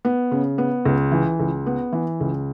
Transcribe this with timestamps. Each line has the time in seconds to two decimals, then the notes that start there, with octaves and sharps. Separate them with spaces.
0.05 B3
0.32 C#3
0.58 B3
0.86 C#2
1.12 E3
1.39 C#2
1.66 B3
1.92 E3
2.20 C#2